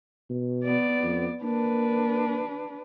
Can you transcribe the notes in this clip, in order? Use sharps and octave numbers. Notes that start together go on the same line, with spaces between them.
B2
B3 D5
F2
A#3 D4 B4